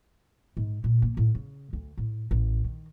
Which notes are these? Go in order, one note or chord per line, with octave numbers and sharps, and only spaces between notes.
G#2
A#2
A#3
A2
C#3
D2
A2
A1
D#3